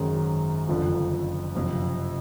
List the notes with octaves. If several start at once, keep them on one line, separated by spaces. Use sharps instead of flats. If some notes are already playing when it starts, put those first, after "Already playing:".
Already playing: G#1 F#2 D#3 G#3 C#4
F#1 F2 D3 F3
F#1 F2 C3